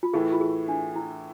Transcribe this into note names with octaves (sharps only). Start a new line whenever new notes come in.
F4
A2 E3 A3 G#4
F4
G#4
D4
E4